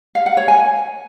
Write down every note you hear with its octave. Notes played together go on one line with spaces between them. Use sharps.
F5
F#5
C#5
G#5